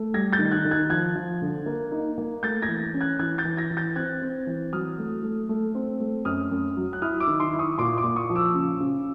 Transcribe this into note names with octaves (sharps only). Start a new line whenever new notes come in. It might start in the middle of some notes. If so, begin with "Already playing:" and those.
Already playing: A3
G3 G#6 A#6
G6 A6
D#3
F#6 G#6
D#3
F#6 G#6
F3 F#6 G#6
F3
D3
A#3
D#4
A#3
A3 G6 A6
G#6 A#6
E3
C#4
F#6 G#6
E3 F#6 G#6
G6 A6
E3
G#6 A#6
E3
G6 A6
C4 F#6 G#6
C4
E3
F#3 D#6 F6
A3
A3
A3
C4
A3
F#2 D#6 F6
F#2
F#3
F#6
E4 D#6 F6
D6 E6
D#3
C6 D6
E4
C#6 D#6
A#2 C6 D6
C6 D6
A#2
C#6 D#6
F3
D6 E6
C#3
C#3